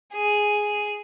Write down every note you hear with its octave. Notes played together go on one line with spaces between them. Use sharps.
G#4